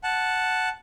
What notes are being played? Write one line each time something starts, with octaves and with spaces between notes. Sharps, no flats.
F#5 A5